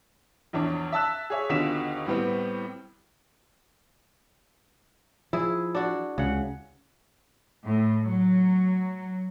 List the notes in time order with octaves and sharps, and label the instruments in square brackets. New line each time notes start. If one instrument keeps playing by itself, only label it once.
[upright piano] A#1 E2 D4 C#5
E5 A5 E6 F#6
G#4 C#5 E5
D#2 B2 D3 F4 B6 E7
A2 G3 B3 C4
[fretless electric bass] F3 [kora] E4 G#4
[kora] D4 F#4
[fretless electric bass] C#2 [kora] C#3 F#5
[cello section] A2
F#3